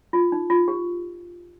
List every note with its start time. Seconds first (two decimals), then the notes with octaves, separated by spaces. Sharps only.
0.13 F4
0.32 D#4
0.50 F4
0.68 G4